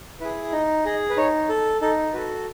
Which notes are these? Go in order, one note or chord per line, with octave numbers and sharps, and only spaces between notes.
E4 G#4 B4
D#4 D#5
G#4 D#5
B4
D#4 C#5
A4
D#4 A4
F#4 A4 B4